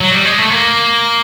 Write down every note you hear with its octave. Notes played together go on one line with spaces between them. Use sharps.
F#3
G3
G#3
A3
A#3